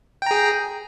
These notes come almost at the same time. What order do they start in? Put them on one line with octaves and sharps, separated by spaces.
G5 A#5 G#4